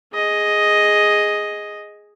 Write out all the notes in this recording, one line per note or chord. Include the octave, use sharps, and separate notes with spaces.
G#4 D#5